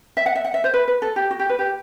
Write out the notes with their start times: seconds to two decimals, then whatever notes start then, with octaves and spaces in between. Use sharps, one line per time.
0.17 E5
0.26 F#5
0.35 E5
0.45 F#5
0.54 E5
0.64 C5
0.74 B4
0.88 B4
1.02 A4
1.16 G4
1.31 F#4
1.39 G4
1.49 B4
1.59 G4